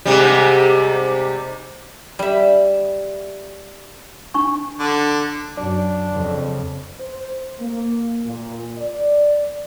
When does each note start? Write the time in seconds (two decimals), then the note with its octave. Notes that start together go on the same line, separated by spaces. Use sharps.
0.05 G#2 C3 G3
2.19 G3 E5
4.34 D4 C#6
4.79 D3
5.57 F#2 D4
6.13 F2 C#3
7.00 C5
7.60 A#3
8.26 A#2
8.78 D5